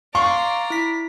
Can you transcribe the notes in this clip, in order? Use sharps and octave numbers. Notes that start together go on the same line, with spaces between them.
D5 F5 A#5 C6 C#6 C7
E4 B6